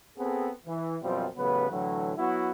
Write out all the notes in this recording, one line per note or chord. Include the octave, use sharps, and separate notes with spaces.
B3 C4 G#4 A4
E3
F#2 B2 F3 G3 C4 F4
A1 C#3 F#3 B3 B4
A2 D3 E3 F#3
F#3 B3 E4 F#4